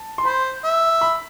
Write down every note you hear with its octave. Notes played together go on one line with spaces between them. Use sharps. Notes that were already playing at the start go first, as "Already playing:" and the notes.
Already playing: A5
C6
C5 B5
E5
B5